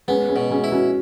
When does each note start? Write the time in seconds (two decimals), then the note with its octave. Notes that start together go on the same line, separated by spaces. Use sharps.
0.08 G#3 B3 C#4
0.29 G#3 C#4
0.36 B2
0.50 G#3 C#4
0.64 E4
0.72 C#4 F#4